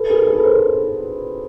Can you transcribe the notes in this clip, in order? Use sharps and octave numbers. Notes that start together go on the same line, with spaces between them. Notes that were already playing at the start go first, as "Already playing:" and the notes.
Already playing: A4 B4
G#4 A#4
A4 B4
A#4 C5